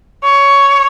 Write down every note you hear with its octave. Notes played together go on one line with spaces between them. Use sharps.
C#5